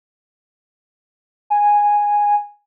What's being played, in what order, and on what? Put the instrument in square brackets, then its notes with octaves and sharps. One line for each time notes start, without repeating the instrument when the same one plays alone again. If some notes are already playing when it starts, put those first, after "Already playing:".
[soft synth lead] G#5